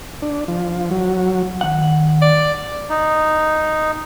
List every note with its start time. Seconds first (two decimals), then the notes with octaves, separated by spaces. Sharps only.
0.22 D4
0.48 F3
0.91 F#3
1.61 D#3 F#5
2.22 D5
2.89 D#4